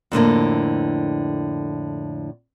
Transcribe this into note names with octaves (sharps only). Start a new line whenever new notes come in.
F2 A2 D3 A#3